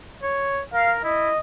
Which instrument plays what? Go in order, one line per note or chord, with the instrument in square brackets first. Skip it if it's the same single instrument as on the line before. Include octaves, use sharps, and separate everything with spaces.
[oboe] C#5
[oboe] A#4 [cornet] F5
[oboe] E4 [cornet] D#5